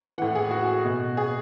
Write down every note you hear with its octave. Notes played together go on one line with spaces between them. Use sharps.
A2 E3 F#5
G#4
F#4
B2
G#4